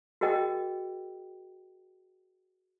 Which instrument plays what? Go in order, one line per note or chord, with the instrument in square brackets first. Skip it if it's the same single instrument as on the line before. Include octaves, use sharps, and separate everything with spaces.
[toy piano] F#4 G#4 A#4 D#5 G5